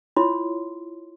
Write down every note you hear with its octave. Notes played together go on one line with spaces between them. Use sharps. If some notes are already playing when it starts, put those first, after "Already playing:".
E4 F4 C#5 C6